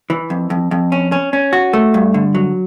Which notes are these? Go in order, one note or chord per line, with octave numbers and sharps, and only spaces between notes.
E3
F2
F2
F2
C#4
C#4
C#4
F#4
A3
G2
D3
F#3